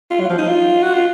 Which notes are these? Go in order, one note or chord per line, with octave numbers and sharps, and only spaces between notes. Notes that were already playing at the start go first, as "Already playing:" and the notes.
F4
F#3
F3
D#4
F4
F#4
F4